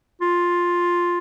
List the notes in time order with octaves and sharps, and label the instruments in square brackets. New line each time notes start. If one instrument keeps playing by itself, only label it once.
[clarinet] F4